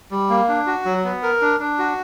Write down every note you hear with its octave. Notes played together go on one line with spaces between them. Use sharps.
G3
A#3
D4
F#4
F#3
B3
A#4
D4
D4
F#4